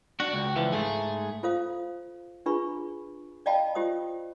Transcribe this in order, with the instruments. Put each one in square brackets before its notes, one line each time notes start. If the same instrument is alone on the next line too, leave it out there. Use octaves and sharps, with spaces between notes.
[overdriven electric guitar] D4 [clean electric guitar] F#4
[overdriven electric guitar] C#2
[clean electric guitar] E3 F3
[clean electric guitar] G#2 A3 [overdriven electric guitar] G#4
[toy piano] F4 A4 C5 F5 D#6
D4 F4 G#4 B4 B5 C#6
D5 D#5 F5 G5 A5 B5
F4 G4 C5 D#6